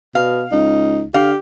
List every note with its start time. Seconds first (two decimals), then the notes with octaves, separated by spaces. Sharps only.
0.15 B2 F5
0.52 C#2 D#4
1.14 D3 G4 F5